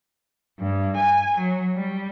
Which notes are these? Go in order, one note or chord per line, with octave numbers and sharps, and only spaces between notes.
G2
G#5
F#3
G3